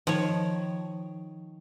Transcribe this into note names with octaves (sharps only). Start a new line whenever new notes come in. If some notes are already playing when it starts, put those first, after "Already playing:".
D#3 F3 C#5